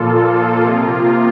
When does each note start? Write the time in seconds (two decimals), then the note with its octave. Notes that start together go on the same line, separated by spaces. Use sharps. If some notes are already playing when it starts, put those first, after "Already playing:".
Already playing: A#2 F3 A#3 F4 A4
0.34 F4
0.63 C3 F3 A#3